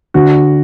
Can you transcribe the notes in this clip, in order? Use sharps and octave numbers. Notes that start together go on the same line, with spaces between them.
D3 F#4